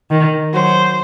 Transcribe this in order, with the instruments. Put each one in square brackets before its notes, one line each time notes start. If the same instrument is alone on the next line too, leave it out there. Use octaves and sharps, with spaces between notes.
[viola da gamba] D#3
[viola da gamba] F#3 [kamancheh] C5